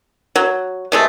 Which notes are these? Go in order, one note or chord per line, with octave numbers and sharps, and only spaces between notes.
F#3
C3 G#3 A3